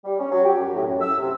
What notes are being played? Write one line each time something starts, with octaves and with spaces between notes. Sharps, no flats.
G3
C#4
F#3
G4
F#2
A2
F#2
E6
C3